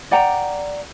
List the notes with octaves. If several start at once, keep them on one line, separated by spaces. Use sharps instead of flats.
D5 F#5 G5 A#5